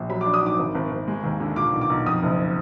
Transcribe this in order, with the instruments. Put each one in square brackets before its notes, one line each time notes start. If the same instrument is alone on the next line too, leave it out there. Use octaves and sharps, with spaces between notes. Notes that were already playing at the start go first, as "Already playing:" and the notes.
Already playing: [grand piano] A#1
F#3 B5
D6
D4
D#6
G#2 D6
G#1
G#1
G#1
G#3
D#2
D3
A#2 D6
B1
D6
B1
F2 D#6
F#1